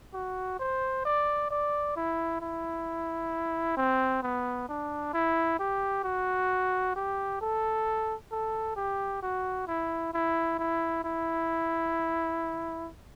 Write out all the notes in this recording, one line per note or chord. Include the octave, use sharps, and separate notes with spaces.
F#4
C5
D5
D5
E4
E4
C4
B3
D4
E4
G4
F#4
G4
A4
A4
G4
F#4
E4
E4
E4
E4